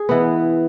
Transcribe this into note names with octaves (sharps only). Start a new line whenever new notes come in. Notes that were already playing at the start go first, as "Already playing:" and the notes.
Already playing: G#4
E3 B3